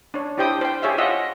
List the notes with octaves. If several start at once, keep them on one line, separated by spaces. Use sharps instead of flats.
D4 C#5
D4 E4 G4 C5 G5 D#6
C5 G5
G4 G#4 C#5 E5 F5
F4 D#5 E5 F#5